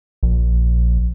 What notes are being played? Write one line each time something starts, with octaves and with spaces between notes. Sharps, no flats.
A#1